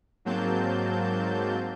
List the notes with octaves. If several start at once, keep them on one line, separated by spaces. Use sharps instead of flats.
G#2 F#3 A#3 C4 A5 G6